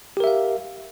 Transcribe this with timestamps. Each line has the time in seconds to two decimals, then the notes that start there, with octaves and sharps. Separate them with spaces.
0.17 G4
0.20 A#4
0.24 E5
0.27 F5